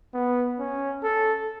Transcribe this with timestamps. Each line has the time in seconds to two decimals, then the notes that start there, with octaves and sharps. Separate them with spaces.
0.14 B3
0.59 C#4
1.03 A4